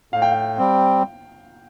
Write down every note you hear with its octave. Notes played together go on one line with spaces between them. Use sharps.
A2 F5
G5
F5
G3 C4